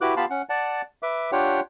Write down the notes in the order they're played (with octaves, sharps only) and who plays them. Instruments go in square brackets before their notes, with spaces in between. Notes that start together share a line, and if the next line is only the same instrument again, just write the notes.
[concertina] E4 F#4 G4 B4 D6 F#6
B3 F4 G4 F5 A5 B5
C#4 F#5
D5 F#5 A5
B4 E5 D6
D4 F4 G4 C#5 F#5 G5